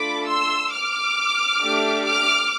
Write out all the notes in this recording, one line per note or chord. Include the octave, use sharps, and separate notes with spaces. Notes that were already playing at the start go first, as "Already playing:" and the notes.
Already playing: A3 D4 F4 A4 B5 D6
C6 E6
D6 F6
A3 D4 G4
D6 F6